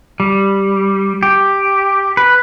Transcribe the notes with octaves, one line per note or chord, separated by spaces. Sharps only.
G3
G4
B4